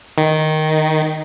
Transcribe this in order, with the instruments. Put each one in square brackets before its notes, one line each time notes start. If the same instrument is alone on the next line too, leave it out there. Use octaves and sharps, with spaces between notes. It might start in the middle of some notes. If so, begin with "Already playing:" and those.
[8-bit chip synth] D#3